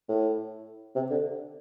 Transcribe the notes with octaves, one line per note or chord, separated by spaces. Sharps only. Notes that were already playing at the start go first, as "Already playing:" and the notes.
A2
C3
D3